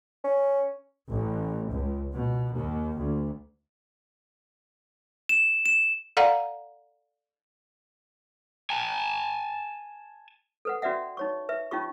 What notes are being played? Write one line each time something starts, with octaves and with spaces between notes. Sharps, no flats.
C#4
A1
C#2
B2
D#2
D2
E7
E7
A4 D5 F5 F#5 A#5
G#5 A5
A4 B4 F#5
C#4 F#4 B4 D5 E5 F#5
D#4 C#5 C#6
B4 E5
C#4 D#4 F4 G4 C#6